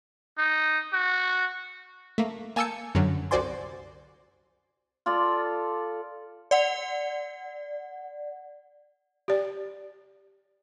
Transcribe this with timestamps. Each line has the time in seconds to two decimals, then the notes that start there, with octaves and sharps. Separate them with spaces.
0.38 D#4
0.93 F#4
2.18 A3 A#3
2.56 A#3 G#5 A5 E6 G6 C#7
2.95 F#2 D3 F#3
3.31 C2 F#4 C5 D5 G#5 C6
5.06 F4 A4 D5
6.51 D5 F#5
9.28 G4 D5